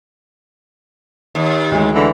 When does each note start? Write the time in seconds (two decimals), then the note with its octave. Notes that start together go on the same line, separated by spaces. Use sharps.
1.35 D#2
1.72 D2 G#3
1.95 D3 E3